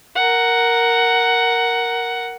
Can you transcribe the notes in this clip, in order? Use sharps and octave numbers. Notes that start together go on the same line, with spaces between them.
A#4 F#5